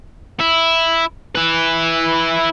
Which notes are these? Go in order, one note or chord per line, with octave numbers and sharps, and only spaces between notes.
E4
E4 B4